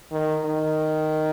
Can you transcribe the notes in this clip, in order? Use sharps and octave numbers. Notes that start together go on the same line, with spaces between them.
D#3
D#3